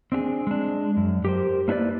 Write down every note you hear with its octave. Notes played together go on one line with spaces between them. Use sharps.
C4 D4 G4 G#4
G#3 D4
F#2
G4 A#4 C5
A#3 D4 E4 B4 D5